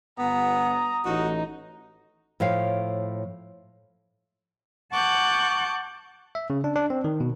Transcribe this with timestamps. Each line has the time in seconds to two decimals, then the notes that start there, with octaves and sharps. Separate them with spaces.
0.19 G1 G2 B3 F#5 A#5 D#6
1.05 A1 D#4 F#4
2.40 A2 F3 C#5 F5 G5
4.91 F#5 A5 C#6 D6 F#6 G6
6.35 E5
6.50 C#3
6.64 D4
6.76 D4
6.90 C4
7.04 D#3
7.20 B2